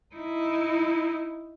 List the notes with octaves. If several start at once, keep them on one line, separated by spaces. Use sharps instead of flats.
D#4 E4